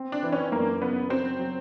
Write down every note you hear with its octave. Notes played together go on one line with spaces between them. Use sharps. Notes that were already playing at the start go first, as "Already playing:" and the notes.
Already playing: C4
D4
E3
C#4
F#2 A#3
C#3 B3
F#3 C4
F#3